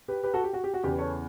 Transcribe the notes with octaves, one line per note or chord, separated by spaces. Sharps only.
G4 B4
G4 B4
F#4 A4
G4
F#4
G4
F#4
E2 C#3 E3 G4
A4 C#5